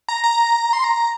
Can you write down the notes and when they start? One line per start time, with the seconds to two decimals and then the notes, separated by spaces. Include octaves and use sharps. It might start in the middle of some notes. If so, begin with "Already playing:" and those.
0.08 A#5
0.24 A#5
0.73 C6
0.84 A#5